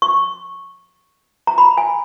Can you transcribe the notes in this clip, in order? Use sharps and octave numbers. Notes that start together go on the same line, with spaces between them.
C#6
A#5
B5
G#5